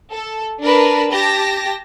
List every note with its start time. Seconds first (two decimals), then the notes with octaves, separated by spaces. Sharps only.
0.12 A4
0.62 D4 A#4 B4 A5
1.12 G4 A5 A#6